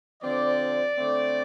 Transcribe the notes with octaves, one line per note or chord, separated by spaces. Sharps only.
D3 F3 C4 D5
D3 A3 C4